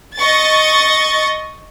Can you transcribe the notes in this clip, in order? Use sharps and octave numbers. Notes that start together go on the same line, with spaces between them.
D#5 C#6 A6